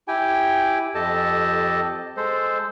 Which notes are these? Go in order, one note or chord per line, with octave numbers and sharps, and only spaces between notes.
E4 G4 G5 G#5
F2 G4 A4 D#5 A5
G#3 A4 C5